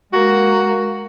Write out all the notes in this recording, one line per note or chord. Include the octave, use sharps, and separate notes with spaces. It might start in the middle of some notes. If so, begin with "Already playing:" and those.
G#3 A#3 F#4